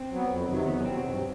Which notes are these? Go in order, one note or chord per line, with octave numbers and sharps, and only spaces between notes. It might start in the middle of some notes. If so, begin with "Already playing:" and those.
Already playing: C4
F#3 B3
F2
C3 D#3 F#3
E2 B3
C#4
B2 F#3 C4
G2